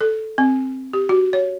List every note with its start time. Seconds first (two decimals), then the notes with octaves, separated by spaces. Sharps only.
0.01 A4
0.38 C4
0.93 G4
1.09 F#4
1.33 C#5